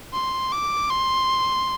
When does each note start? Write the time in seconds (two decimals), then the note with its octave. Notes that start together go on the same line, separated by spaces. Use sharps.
0.14 C6
0.52 D6
0.90 C6